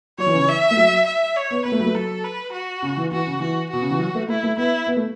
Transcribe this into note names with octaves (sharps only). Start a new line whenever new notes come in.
F#3 C#5
E3
C#3
E3
E5
A3
F#3
E5
C#5
B3
B3 B4
A3
F#3
A3
F#3 A4
B4
F#4
C#3
E3
E3 F#4
C#3
E3 F#4
B2 F#4
C#3
E3
F#3
A3
A3 E4
A3
B3 E4
B3
A3